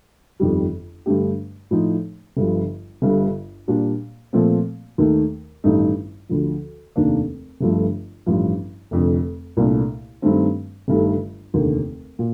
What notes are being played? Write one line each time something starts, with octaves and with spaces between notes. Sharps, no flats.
G1 F2 D#3 G3
G2 D3 A3 D4 G4
A2 F3 A3 D#4
G1 G2 F3
G1 G2 D3
A#2 G3 D4
A#2 F3 A3 C4
D#2 D#3 A3
A1 G2 D#3 A3 D#4
D2 D3 F3
F1 D#2 D#3 A#3 D4
G1 G2 F3 A3
A1 G2 F3
F1 F2 D3
C2 A#2 A3 D4
G2 D#3 A3 C4
G1 G2 D#3 A3
F1 D#2 D3
A#2